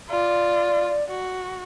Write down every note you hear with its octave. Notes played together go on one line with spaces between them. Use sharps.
F4 D5
F#4